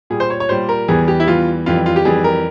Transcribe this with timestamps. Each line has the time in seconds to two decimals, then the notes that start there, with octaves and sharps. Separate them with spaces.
0.10 A#2 G3 G#4
0.20 C5
0.30 C#5
0.40 C#5
0.49 A#2 G3 C5
0.69 A#4
0.88 E2 E3 G3 G#4
1.08 G4
1.20 E4
1.27 E2 E3 G3 F4
1.66 F2 E3 G3 F4
1.86 F4
1.96 G4
2.05 F2 E3 G3 G#4
2.24 A#4